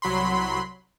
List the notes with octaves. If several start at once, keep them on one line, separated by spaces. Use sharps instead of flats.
C2 F#3 B5 C6